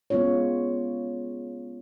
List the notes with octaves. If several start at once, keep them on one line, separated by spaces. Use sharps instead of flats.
G#3 B3 C#4 F4 C#5